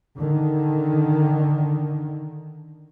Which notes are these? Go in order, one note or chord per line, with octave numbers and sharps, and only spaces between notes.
D3 D#3